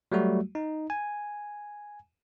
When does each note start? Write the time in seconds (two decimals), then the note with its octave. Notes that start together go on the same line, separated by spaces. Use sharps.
0.12 F#3 G3 A3 F#4
0.55 D#4
0.90 G#5